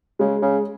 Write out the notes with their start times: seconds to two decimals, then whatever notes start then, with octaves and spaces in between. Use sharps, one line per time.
0.19 C#3 G#3
0.42 C#3